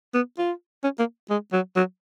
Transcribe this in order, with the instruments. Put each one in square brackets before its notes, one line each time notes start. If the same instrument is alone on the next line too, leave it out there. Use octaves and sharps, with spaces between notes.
[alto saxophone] B3
F4
C#4
A#3
G#3
F#3
F#3